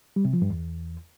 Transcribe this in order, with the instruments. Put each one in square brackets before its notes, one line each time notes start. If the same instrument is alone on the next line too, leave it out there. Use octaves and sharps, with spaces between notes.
[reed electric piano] G3
C3
F3
G2
E2